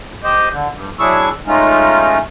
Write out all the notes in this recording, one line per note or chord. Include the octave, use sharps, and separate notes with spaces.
G4 C5 D#5
D3
G2
F#3 D4 E4 G#4 C#6 E6
G#3 A3 C#4 D#4 F4